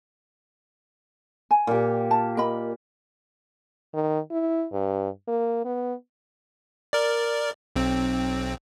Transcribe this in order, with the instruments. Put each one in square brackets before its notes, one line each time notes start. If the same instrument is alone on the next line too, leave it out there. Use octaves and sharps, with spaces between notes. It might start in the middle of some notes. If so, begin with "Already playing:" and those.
[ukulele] G#5
[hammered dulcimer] A#2 G4
[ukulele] A5
A#4 D#5 B5
[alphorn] D#3
E4
G2
A#3
B3
[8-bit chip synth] A#4 D5
B1 C4